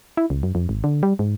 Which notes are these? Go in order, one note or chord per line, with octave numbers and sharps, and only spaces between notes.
E4
C#2
F#2
F2
G#1
D3
G3
G#2